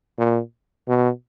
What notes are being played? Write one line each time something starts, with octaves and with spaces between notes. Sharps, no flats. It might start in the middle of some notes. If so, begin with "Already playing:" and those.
A#2
B2